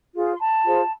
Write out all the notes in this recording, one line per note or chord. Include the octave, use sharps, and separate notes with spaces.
F4 G#4 C5
C6
A5 B5
F4 G#4 C5